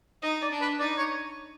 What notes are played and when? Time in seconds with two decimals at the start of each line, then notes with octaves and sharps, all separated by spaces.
0.22 D#4 D#5
0.42 D5
0.52 D4
0.61 B4
0.79 D#4 D5
0.98 C#5